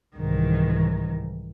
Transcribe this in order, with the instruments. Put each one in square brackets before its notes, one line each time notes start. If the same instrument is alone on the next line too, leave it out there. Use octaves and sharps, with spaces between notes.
[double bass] C2 G#2 [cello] D#3 E3